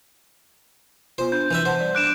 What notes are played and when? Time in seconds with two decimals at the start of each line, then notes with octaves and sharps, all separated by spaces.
1.18 B3 F4 C5
1.32 D4 G6
1.51 E3 B4 E5
1.65 C5 F#5 A5
1.80 G3 D5
1.95 D4 D6 F#6 D7 E7